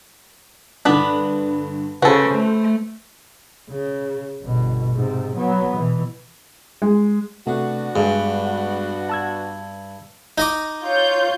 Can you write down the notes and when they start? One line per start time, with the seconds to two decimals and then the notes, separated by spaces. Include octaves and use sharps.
0.85 G2 D3 B3 D4 B4
2.02 C#3 F#4 A4 B4 C5
2.35 A3
3.70 C#3
4.42 G1 B2
4.93 G#2 C3
5.36 F#3 B3
5.76 B2 E3
6.82 G#3
7.47 C3 A3 B3 D4 F#4
7.96 G2 G#3 G#4
9.09 A5 E6 G#6
10.38 D#4 D#5 D6
10.83 F4 C#5 G6